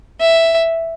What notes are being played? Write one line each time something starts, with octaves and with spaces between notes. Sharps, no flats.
E5